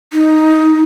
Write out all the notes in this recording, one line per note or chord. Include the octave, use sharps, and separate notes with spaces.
D#4